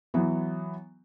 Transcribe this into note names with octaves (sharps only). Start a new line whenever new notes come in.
E3 F#3 B3